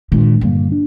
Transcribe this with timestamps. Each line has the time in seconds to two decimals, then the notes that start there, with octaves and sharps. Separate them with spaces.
0.12 A#2 D#3 G#3 D4
0.41 G2 D3 G3 A#3
0.72 D4